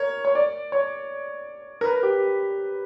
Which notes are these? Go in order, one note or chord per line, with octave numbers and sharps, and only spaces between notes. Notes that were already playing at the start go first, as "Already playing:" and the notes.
Already playing: A#4 C#5
C#5
D5
C#5
A#4
B4
G4